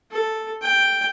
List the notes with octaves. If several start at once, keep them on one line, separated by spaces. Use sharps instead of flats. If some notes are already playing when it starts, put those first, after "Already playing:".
A4
G5